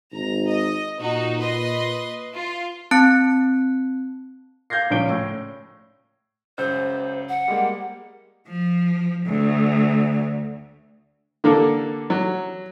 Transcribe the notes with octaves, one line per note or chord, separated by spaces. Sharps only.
G#1 A#5
D#5
A#2 D#4 F#4
B4 D#5 C6
F4
C4 A5 F#6 C#7
F5 G6 G#6 A#6 C7
C#2 A#2 F3 C#4 D7 G7
A2
C#2 F#2 C5 G6
F#5
G3 G#3 A#3
F3
D2
D3 A#3 A4
F#3